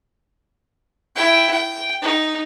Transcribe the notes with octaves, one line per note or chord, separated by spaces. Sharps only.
E4 G5
G5
D#4